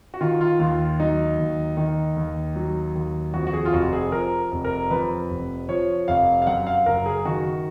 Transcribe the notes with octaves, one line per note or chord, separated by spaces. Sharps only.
F#4
D#3 F4
F4
D#2 F4
F#3 D#4
D#2
D#3 D#4
D#2
F#3
D#2
F2 F#4
F#4
G#4
F4
F1 F#4
G#4
F3 A#4
F1
A#4
F2 B4
F1
F3 C#5
F1 F5
F5
F#2 F#5
F5
F#1 A#4
G#4
D#3 F#4